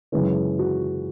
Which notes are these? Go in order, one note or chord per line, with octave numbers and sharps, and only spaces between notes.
F#2 C#3 E3 G#3 C#4 B4
F#4